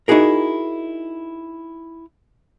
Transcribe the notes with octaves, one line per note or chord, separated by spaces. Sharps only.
D#4 E4 F#4 G#4 A#4